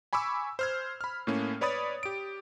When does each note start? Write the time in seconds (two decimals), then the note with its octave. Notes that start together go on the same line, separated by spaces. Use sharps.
0.13 G#5 B5 C#6 D6 E6
0.59 C5 F6 G#6
1.01 B5 F6
1.27 A2 A3 A#3 C#4
1.61 B4 C#5 D5 B5 D#6 A6
2.03 G4 D7